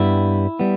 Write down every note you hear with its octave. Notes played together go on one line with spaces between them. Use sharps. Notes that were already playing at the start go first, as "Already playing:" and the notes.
Already playing: G2 G3 B3 E4
G3 B3